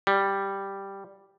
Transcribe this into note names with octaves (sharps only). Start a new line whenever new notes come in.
G3